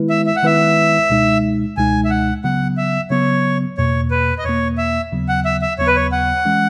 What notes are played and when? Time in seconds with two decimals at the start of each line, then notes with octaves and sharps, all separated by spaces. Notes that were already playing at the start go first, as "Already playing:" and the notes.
Already playing: D#3 G#3 B3 E4 B4
0.10 E5
0.26 E5
0.36 F#5
0.43 D#3 G#3 B3 E4 B4 E5
1.10 C#2 B2 G#3 D#4
1.77 C#2 B2 G#3 D#4 G#5
2.05 E5
2.10 F#5
2.44 C#3 F#3 B3 F#5
2.77 E5
3.10 C#3 F#3 B3 C#5
3.77 E2 B2 A#3 C#5
4.11 B4
4.38 D#5
4.44 E2 B2 A#3 C#5
4.78 E5
5.12 D#2 C#3 F#3 B3
5.28 F#5
5.45 E5
5.62 E5
5.78 D#2 C#3 F#3 B3 C#5
5.87 B4
5.96 C#5
6.12 F#5
6.45 E3 G#3 C#4